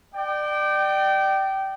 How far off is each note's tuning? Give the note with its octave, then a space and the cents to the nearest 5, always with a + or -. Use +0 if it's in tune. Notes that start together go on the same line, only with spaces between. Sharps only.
D5 +30 G5 -20